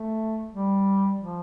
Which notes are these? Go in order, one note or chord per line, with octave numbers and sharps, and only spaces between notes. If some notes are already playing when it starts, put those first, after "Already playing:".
Already playing: A3
G3
F3